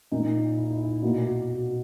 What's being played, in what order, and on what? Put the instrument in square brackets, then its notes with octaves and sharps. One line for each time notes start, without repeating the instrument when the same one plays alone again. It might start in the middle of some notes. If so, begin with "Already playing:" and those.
[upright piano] A#2 A#3 D#4
E4
D#4
E4
B2 A#3 F#4
F#4
F#4